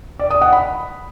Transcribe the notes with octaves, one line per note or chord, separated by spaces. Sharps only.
D5
D#6
F#5
B5